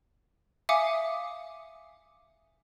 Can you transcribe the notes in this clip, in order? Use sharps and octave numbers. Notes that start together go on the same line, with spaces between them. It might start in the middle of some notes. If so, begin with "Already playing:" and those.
E5 F5 G#5 D6 D#6 C#7